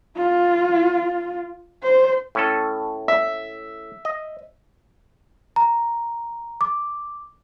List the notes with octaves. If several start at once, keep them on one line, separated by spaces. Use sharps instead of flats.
F4
C5
A2 C#4 A4
E5
D#5
A#5
D6